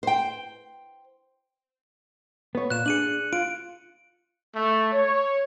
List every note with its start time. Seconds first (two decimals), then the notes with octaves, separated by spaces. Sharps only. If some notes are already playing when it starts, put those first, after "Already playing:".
0.03 C5 G5
2.55 B3 C#5
2.70 A#2 F#6 E7
2.86 D4 G#4 C#7 D#7 F#7
3.33 F4 D7
4.56 A3
4.93 C#5